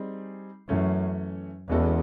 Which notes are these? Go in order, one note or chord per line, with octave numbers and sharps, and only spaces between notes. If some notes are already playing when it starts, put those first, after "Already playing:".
Already playing: G3 C4 D#4 G#4
F#2 E3 A3 C#4
E2 E3 G#3 C#4 F#4 A4